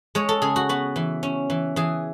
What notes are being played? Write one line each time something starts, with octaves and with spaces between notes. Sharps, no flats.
G#3 C#5
A4
C#3 G#4
F#4
B3 F#4
E3
C#4
E3
E3 G#4